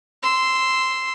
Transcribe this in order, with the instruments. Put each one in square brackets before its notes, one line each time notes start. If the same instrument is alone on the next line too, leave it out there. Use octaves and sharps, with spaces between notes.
[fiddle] C6 E6